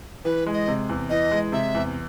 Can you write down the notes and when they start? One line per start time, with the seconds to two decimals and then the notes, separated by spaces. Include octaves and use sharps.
0.25 E3 B4
0.47 G#3
0.53 D#5
0.68 C3
0.89 E2
1.09 E3 D#5
1.31 G#3
1.52 C3 E5
1.75 E2